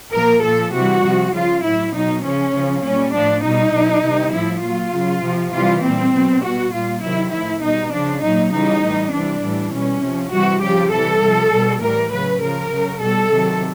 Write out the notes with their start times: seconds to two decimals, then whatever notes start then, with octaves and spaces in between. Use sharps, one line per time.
0.14 A#2 F3 A#4
0.43 A#2 F3 A4
0.73 C3 E3 G3 F#4
1.03 C3 F3
1.33 C#3 F3 F4
1.63 A2 F#3 E4
1.93 B2 F#3 D#4
2.23 C#3 F3 C#4
2.53 C#3 F3
2.83 A#2 G3 C#4
3.13 A2 F3 D4
3.43 B2 G3 D#4
3.73 B2 F#3
4.03 C3 D#3 G3
4.33 A2 F3 E4
4.62 A#2 F#3 F4
4.92 C#3 F#3
5.22 C3 F3
5.52 C3 E3 G3 F4
5.83 A#2 G3 C4
6.13 B2 F#3
6.42 B2 G3 F#4
6.72 A#2 G3 F4
7.03 C3 D#3 F#3 E4
7.32 A2 F3 E4
7.62 B2 G3 D#4
7.92 C#3 F3 D4
8.22 A#2 F#3 D#4
8.53 C#3 E3 G3 D#4
8.82 A2 E3 G3
9.12 C3 E3 G3 D4
9.42 A2 E3 G3
9.72 B2 G3 C#4
10.02 C3 F3
10.31 C3 E3 G3 F#4
10.61 C#3 F3 G4
10.91 C3 E3 G3 A4
11.21 C3 F3
11.52 B2 G3
11.82 A2 E3 G3 A#4
12.11 C#3 F#3 B4
12.42 C#3 F3 A#4
12.72 C#3 F#3
13.01 B2 G3 A4
13.31 C3 D#3 F#3